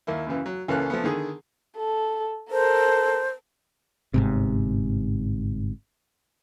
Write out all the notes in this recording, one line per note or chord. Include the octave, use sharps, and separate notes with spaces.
D#2 A#3 E4
F#2 C#3 E3
F#3
C#2 E3 A#3 C#4 A4 F#6
F3 A3 B3
D3 D#3 G#4
A4
A4 A#4 C5
G1 G#2 C3